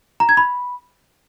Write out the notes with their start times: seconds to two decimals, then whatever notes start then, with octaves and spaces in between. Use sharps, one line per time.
0.20 A#5
0.29 G#6
0.37 B5